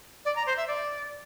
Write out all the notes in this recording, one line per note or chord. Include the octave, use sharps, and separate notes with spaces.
D5
A#5
C5
E5
D5